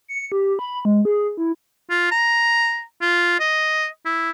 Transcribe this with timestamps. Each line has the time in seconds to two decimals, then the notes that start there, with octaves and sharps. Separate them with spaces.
0.08 C#7
0.32 G4
0.59 B5
0.85 G#3
1.05 G#4
1.37 E4
1.90 F4
2.11 A#5
3.02 F4
3.40 D#5
4.06 E4